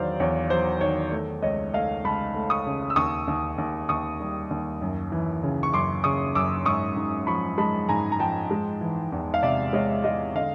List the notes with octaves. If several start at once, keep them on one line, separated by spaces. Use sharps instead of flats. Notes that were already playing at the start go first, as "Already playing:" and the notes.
Already playing: E2 D#3 F#3 C5 D5 F5
E2 C#5
F#3 C5
D#3 C#5
A3
C#2 C#5 D#5
A3 D#5 F5
C#2 A5 B5
A3
C#6 D#6
C#3
E6
D#2 C#6 D#6
D#2
D#2
D#2 C#6 D#6
G3
D#2
F#2
E3
C#3
C#6
F#2 C6 D6
C#3 C#6 D#6
F#2 D6 E6
G#2 C#6 D#6
G#2
F3 B5 C#6
G#3 A5 B5
G#2 G#5 A#5
A#5
F3 G5 A5
G#3
E3
E2
F5
C3 D5 E5
G#3 C#5 D#5
G#3 D#5 F5
D3 D#5 F5